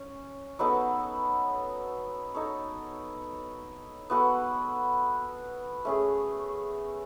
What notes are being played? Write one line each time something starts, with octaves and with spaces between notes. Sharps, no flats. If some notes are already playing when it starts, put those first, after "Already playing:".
Already playing: C#4
F#3 B3 D#4 A4
D#4 A4 C#5
B3 F#4 A4
A3 C#4 G#4